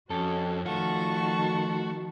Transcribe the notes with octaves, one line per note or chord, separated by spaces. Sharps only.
F2 C#4 F#4 A4
D#3 F3 A3 F4 F#4 A5 C#6